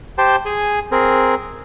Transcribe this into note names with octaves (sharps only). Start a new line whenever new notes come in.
G4 C5 G5 A5 C6
G#4 G#5
C4 G#4 A#4